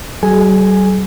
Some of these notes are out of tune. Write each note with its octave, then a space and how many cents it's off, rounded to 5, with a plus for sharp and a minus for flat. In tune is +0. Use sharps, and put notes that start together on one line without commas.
G3 -45 G#4 +40 G#5 +0